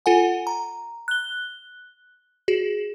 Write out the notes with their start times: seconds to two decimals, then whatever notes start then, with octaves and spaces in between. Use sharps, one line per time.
0.06 F4 A4 F#5 G#5
0.47 A#5
1.08 F#6 G7
2.48 F#4 G#4